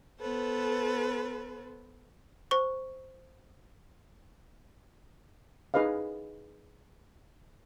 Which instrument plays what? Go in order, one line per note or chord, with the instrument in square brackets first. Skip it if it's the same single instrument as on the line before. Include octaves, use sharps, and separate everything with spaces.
[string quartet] B3 A4 B4 C5
[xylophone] C5 C#6
[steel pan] D#4 G#4 B4 D#5 F5